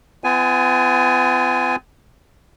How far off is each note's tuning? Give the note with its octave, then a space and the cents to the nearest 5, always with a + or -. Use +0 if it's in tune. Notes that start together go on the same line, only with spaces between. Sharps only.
B3 +45 F4 -35 G#5 +0